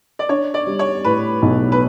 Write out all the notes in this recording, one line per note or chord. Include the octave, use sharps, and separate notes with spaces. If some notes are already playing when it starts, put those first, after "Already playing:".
D5
D4 C#5
D5
G3
C#5
A2 B4
B1
B4